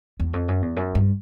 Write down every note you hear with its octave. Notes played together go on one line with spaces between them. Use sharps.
E2
F2
F#2
E2
F#2
G2